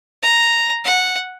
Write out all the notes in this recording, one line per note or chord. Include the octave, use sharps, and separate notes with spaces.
A#5
F#5